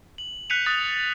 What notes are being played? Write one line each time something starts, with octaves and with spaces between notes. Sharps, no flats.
F#7
F#6 G6 B6 C#7 D#7 F7
D#6 F#6 A6